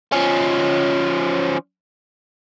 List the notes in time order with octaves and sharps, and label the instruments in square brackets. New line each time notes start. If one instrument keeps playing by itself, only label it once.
[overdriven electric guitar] F3 C#4